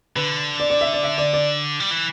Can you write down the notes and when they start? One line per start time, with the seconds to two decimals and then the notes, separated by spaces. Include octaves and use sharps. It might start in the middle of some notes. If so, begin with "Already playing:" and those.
0.16 D3 B4
0.60 D5
0.70 D5
0.81 E5
0.93 D5
1.03 E5
1.18 D5
1.33 D5
1.80 G3
1.91 E3